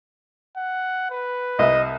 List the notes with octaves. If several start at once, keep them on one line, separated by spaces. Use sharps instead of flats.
F#5
B4
C2 D#5 E5